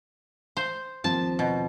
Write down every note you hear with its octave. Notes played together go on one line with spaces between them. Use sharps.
C5
D#2 F3 C4 A5
B2